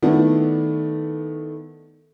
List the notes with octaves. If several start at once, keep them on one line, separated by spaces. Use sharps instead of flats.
D#3 A3 B3 D4 E4